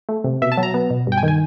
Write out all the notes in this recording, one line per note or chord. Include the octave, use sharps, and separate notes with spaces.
A3
C3
B2 E5
A5
F#3
A#5
B3
B2
G2 G5
G#5
D#3
G#5